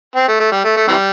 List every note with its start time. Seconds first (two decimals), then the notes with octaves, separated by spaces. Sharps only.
0.16 C4
0.28 A3
0.40 A3
0.51 G3
0.64 A3
0.77 A3
0.88 C3 E3 G3